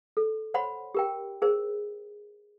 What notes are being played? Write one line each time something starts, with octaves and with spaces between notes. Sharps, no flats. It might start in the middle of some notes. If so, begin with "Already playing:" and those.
A4
C5 C#5 F#5 B5 C6
G4 A#4 G5
G#4 A#4 C5